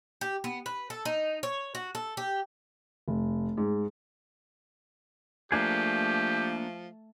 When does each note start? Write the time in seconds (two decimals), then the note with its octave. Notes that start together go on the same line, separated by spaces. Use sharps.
0.21 G4
0.44 B3
0.66 B4
0.90 A4
1.05 D#4
1.43 C#5
1.75 F#4
1.95 A4
2.17 G4
3.08 F1
3.57 G#2
5.52 F3 A3 A#3 D4 G4 G#4